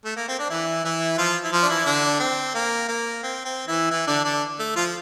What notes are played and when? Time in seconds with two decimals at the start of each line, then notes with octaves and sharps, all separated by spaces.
0.05 A3
0.16 A#3
0.28 C4
0.39 D4
0.50 E3 E4
0.84 E3 E4
1.18 F3 F4
1.44 E4
1.52 F3 F4
1.63 D4
1.69 E3 E4
1.86 D3 D4
2.20 C4
2.54 A#3
2.88 A#3
3.23 C4
3.45 C4
3.67 E3 E4
3.91 E3 E4
4.07 D3 D4
4.24 D3 D4
4.59 A3
4.76 F3 F4